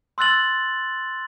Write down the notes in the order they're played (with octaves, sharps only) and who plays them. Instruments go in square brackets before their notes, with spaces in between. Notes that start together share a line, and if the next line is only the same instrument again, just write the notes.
[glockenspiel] C6 E6 F#6 A6 F#7